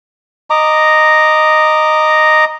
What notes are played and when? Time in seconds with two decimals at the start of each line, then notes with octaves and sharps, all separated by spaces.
0.50 D#5 A#5 D6